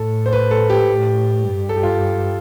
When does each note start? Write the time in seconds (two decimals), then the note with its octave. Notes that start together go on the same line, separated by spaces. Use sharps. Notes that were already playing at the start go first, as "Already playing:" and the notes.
Already playing: A2 A4
0.26 C5
0.33 B4
0.51 A4
0.70 G4
0.88 A2
1.43 G2
1.69 A4
1.77 G4
1.83 F4